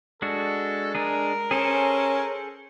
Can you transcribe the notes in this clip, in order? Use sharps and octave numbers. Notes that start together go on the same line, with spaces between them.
G#3 D4 F#4 A4
G#3 D4 G#4 A#4
C#4 G#4 A4 C5